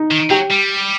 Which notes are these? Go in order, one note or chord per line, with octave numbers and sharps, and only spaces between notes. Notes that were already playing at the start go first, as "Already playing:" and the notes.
Already playing: D#4 D#5
D#3
F#3 G4 G5
G3